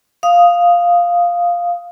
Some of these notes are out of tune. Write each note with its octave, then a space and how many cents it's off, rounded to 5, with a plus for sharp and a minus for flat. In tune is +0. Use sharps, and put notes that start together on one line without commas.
F5 +0 D#6 +0